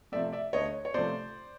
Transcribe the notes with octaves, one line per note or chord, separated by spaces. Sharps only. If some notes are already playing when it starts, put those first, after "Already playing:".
C3 F3 A3 D5 E5
D5 E5
D2 C#5 D#5
C#5
C3 F3 A3 C5 D5